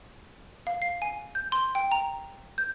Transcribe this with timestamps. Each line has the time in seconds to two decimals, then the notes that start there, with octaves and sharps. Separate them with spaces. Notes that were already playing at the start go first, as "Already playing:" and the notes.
0.67 F5
0.82 C7
1.02 G#5
1.35 G6
1.52 C6
1.75 G5
1.92 A#5
2.58 G6